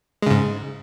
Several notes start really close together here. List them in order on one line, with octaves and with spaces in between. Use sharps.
G#3 C#3 G#2